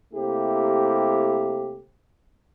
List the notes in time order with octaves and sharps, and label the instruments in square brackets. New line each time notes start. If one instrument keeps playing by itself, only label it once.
[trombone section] C3 A3 A#3 E4 G4